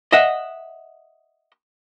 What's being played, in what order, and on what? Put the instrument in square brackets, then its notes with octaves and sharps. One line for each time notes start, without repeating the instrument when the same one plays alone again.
[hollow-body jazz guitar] D#5 E5 F#5